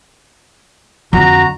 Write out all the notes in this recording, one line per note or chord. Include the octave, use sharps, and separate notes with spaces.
F2 D3 F#4 A#5